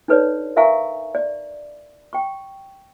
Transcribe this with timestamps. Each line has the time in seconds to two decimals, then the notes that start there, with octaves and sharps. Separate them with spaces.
0.08 D4 D#4 A4 B4 C#5 D5
0.56 A#4 E5 F5 G#5 A#5 C#6
1.15 D5
2.13 G5 C#6